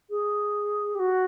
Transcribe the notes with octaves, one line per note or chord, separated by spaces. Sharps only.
G#4
G4
F#4